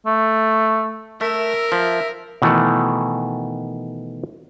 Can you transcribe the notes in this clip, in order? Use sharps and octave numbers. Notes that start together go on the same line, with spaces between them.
A3
A3 A#4 E5
F3
B2 D#3 E3 A3 F#5